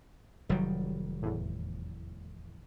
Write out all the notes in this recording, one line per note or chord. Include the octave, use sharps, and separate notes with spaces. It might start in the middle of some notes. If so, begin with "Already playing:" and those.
F1 D#3 F#3 G3
E2 A2